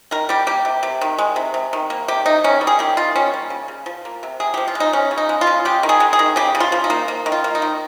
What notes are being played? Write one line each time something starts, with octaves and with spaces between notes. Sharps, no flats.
D#3 A#4
G3 G4
A#3 G4
C3
C3
D#3
G#3
C3
C3
D#3
A#3
C3 G4
C3 D#4
D#3 C#4
G3
G#4
D#3 G4
D#3 F4
G3 C#4
A#3
C#3
C#3
F3
A#3
C3
C3 G#4
F3 G4
F4
G#3
D#4
G#3 C#4
C#3
D#4
G#3
F4
C#3
G#3 G4
D#3
G#4
G#3
G#4
D#3
C#3 G4
C#3
F4
F3
D#4
A#3
A#3
D#3
F4
A#3
D#4
D#3